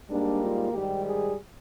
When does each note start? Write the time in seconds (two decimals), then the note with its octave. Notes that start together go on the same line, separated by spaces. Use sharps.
0.10 G#2 G3 A#3 D4
0.41 F4
0.72 G#2 D#3 G3 G4
1.02 G#4